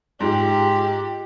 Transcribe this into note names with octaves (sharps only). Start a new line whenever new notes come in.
G#2 F4 G4 G#4